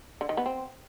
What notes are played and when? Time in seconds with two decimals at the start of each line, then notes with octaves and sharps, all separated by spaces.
0.21 D3
0.29 D#3
0.37 B3
0.46 C4